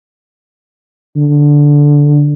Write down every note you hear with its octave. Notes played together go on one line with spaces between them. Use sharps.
D3